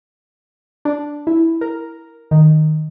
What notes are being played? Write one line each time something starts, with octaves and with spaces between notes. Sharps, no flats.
D4
E4
A#4
D#3